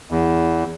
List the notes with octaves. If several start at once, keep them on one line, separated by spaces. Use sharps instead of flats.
E2